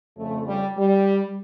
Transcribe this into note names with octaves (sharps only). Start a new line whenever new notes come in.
F2 C#3 F3 A3
G3
G3